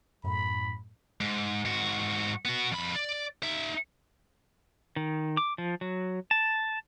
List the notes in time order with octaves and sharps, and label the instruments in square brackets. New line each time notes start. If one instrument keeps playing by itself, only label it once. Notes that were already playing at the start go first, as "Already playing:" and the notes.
[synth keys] F#2 A2 [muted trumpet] B5
[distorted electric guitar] G#2
G#2 F#4
B3 F#4
F2 B5
D5
D#4 E5
[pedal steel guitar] D#3
D6
F3
F#3
A5